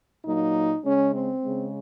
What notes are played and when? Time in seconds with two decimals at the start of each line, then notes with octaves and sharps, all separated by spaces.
0.25 A#2 F#3 A#3 D#4
0.85 C#3 G#3 C#4
1.15 C4
1.44 C#3 G#3